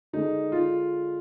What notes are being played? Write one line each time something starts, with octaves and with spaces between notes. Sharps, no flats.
D3 G#3 D#4
F4